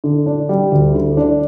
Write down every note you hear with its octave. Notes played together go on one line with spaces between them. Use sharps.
D3
D4
G3
D2
D3
D4